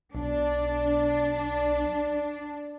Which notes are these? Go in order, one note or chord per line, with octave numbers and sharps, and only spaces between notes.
B1 D4